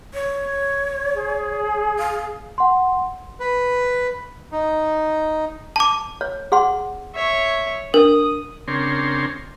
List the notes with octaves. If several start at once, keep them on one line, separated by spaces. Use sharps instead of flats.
C#5
G#4
F5
F#5 C6
B4
D#4
A5 D6
C#5
G#4 F#5 C6
C#5 E5
D4 A#4 D#6
C#3 C4 D4 A#4 C#5 C6